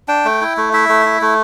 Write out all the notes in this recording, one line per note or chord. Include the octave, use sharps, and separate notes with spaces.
D4 G5
A3
E4
A3
E4 E5
A3
E4
A3